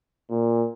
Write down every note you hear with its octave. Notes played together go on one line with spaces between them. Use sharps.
A#2